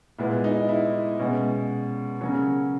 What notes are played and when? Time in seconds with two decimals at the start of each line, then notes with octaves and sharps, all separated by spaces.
0.18 A#2 G#3 B3 E4
0.44 D#4
0.69 E4
1.19 B2 G#3 C#4
2.21 C#3 F#3 A#3 C#4